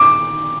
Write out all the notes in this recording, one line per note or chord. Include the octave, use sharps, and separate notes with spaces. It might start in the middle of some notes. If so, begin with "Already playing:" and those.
Already playing: D6